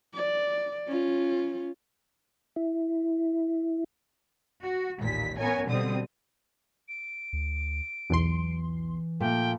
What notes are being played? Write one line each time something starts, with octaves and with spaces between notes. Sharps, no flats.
D5
C#4 F4
E4
F#4
A1 D#2 A#2 B6
B3 C#4 A#4 C#5 G#5
B2 D3 G3 C4 D#6
D7
D2
B1 E2 E3 C6
A#2 F3 A3 G5